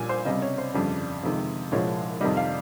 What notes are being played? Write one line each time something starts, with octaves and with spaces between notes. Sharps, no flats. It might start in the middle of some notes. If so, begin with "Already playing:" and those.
Already playing: A#1 A#2 G3 G#5
C5
C#2 C3 G3 D#5
C#5
C5
G1 F2 C#3 G3
F2 C3 D#3 G#3
C2 A#2 F3 G#3 C#5
F2 C3 D#3 G3 D#5
F5